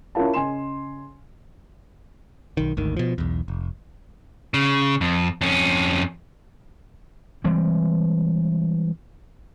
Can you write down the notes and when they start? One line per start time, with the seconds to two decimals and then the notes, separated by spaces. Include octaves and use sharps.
0.15 C#4 E4 F4 A#4 F5 A5
0.33 C#3 D#5 G#5 C6 E7
2.57 B1 D#3
2.77 G#1 D2 D#3
2.97 B2 F3
3.18 B1 E2
3.48 F1
4.54 C#3
5.01 F2
5.41 F2 C#4
7.44 E3 G3 G#3 C4